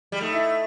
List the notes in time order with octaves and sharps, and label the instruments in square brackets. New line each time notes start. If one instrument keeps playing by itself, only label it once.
[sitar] G3
[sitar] A3 [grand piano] D#4
[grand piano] E4